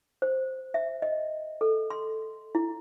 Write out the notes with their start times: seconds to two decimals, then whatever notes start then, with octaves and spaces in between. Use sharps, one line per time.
0.22 C5
0.74 E5
1.02 D#5
1.61 A4
1.90 C6
2.55 E4